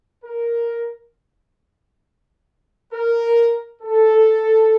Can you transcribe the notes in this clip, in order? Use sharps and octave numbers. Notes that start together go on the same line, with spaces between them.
A#4
A#4
A4